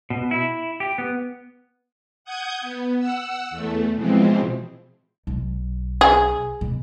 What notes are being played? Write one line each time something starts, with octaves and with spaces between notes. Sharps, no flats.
B2
E4
G4
B3
F#5 D#6 G6 G#6
B3
F#5 E6
E2 A3
B2 E3 F3 G#3 C4
B1
G#4
B2